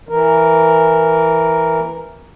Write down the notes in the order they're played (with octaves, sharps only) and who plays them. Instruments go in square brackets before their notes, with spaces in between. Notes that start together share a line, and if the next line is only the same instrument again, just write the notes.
[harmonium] E3 A#4